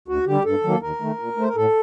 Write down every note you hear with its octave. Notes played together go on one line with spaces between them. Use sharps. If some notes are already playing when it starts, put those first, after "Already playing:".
D2 F#4
D3 G3 G4
G2 A4
D#3 F#3 A#3
D#2 A#4
D#3 A3
A#2
A3 C5
A#4
A2 A4